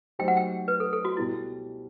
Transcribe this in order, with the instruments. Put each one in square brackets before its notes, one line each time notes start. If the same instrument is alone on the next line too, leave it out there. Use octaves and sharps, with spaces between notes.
[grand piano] F#3 A3 D#4 G4 C5 [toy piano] G5
[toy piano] F#5
G5
B4
A4
A4
F#4
[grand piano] B2 G3 B3 [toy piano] E4